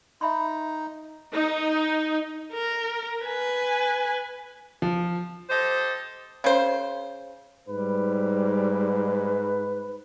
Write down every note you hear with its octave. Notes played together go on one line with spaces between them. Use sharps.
D#4 E5 B5 C6
D#4
A#4
B4 G#5
F3
G4 A4 C5 D#5
C#3 C5
G#2 G3 B4